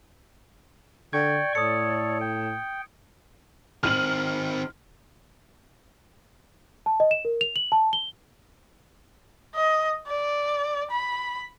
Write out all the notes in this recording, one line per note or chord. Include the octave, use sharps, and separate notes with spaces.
D3 D5 G5 C#6 G#6
A2 A4 C#5 D#6 C#7
G5
D#3 C4 F6 D#7 F#7
A5
D#5
E7
A#4
F7
F#7
A5
G7
D#5
D5
B5